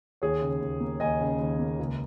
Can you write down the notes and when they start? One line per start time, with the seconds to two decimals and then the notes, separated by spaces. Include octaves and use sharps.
0.22 D#2 G#4 C#5
0.42 C#3
0.61 D#2
0.80 A#3
1.00 D#2 D#5 G#5
1.21 C#3
1.39 D#2
1.59 A#3
1.79 C#2